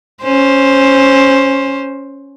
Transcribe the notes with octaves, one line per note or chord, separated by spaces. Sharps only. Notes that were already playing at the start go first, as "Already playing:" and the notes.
C#4 C5